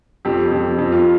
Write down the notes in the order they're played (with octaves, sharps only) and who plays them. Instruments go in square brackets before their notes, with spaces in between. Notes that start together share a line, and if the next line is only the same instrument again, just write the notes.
[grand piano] F2 G4
F2
F2
F4